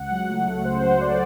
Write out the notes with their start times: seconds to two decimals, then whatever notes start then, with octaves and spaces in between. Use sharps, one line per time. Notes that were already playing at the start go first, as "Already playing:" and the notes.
Already playing: C#2 F#5
0.11 F#3
0.30 A3
0.47 C#3
0.65 C#2 C5
0.83 F#3
1.01 A3 D5